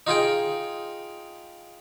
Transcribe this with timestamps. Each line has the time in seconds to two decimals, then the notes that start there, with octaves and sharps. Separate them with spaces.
0.07 D#4 F4 G#4 G5